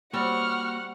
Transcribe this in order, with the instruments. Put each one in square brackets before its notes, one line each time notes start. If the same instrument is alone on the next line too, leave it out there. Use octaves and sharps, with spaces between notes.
[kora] G3 C4 [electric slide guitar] A#3 F#4 C#5 [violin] F#5 [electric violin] C#6 F6